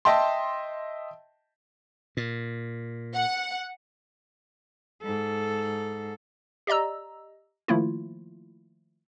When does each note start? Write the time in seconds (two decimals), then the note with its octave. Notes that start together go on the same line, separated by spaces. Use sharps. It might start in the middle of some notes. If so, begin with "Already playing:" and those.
0.05 D#5 E5 G5 A5 C6
2.17 A#2
3.14 F#5
5.03 G#2 A4
6.67 G4 D5 D#5 A#5 E6
7.68 D#3 F3 A3 A#3 E4 F4